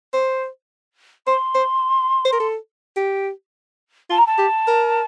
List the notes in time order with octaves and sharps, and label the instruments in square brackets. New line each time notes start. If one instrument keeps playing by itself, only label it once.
[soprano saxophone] C5
[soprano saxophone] C5 [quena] C6
[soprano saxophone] C5
C5
A#4
A4
G4
[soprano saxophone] F4 [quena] A5
[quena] A#5
A5
[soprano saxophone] G4
A#4